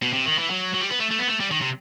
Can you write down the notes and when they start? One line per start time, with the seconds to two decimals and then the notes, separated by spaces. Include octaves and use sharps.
0.02 B2
0.13 C3
0.26 D#3
0.38 E3
0.50 F#3
0.74 F#3
0.81 G3
0.91 B3
1.00 A3
1.11 A3
1.19 B3
1.28 A3
1.40 G3
1.51 D#3
1.61 C3